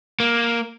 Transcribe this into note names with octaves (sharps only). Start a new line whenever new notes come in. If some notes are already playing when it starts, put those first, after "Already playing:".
A#3